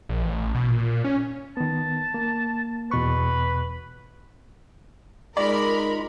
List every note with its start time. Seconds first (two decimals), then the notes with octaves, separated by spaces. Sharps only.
0.09 A#1
0.23 A1
0.55 B2
0.68 A#2
0.87 A#2
1.04 C#4
1.57 D#3 B3 A5
2.14 A#3
2.91 E2 B2 B4 C#6
5.37 G#3 D#4 F4 A#4 D5 D#5 B5